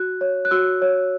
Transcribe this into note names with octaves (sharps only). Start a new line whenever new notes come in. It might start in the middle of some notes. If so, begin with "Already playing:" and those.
Already playing: F#4 F#6
C#5
F#6
F#4 E6
C#5